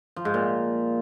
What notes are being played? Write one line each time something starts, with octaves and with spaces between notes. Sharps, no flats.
F3
G#2
A#2